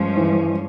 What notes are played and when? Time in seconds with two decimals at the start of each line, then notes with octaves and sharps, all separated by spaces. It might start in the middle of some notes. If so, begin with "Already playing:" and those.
Already playing: G2 F3 G#3 C#4
0.17 E3